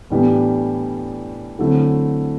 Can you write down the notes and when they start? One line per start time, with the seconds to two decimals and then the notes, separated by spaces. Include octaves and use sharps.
0.10 A2 E3 G3 B3 D4
1.59 D3 F#3 A3 C4 E4